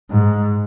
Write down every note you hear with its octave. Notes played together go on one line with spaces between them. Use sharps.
G#2